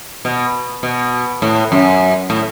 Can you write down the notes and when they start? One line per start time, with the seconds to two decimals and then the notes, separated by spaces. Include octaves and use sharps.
0.25 B2
0.83 B2
1.42 A2
1.72 F#2
2.30 A2